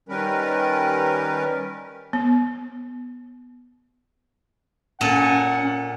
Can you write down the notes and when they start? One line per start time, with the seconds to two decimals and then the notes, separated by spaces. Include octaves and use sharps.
0.09 D#3 G3 C#4 A#4 B4
2.13 B3
5.01 A#2 C#4 A4 F#5 G#5